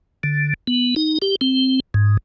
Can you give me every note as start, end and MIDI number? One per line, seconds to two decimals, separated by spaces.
0.23 0.54 50
0.67 0.95 59
0.96 1.18 63
1.22 1.36 67
1.41 1.80 60
1.94 2.17 44